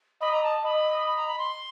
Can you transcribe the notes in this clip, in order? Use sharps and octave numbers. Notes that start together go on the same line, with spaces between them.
D#5 B5
A#5
A5
D#5 B5
B5
A#5
B5
C6